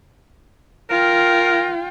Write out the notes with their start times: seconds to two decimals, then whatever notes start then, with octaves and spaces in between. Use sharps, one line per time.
0.90 F4 A#4 G5